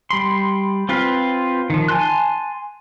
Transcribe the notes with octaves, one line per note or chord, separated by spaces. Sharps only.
G3 B5 C6
C4 F4 B4 F5
D#3 F3
G#5 A5 C6 F#6